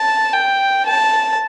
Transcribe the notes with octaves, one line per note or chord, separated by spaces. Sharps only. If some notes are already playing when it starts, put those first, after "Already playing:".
Already playing: A5
G5
A5